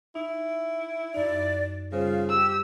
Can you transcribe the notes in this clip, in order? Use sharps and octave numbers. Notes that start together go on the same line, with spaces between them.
D#4 E4
F#2 D#4 D5
C#3 G3 F4 C5
G4 E6